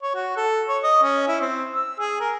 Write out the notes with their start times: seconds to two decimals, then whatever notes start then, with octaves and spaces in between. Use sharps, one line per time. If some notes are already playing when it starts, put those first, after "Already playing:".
0.03 C#5
0.15 F#4
0.37 A4
0.69 C#5
0.83 D#5
1.03 C#4
1.28 E4
1.41 C4
1.75 E6
2.00 G#4
2.21 A#4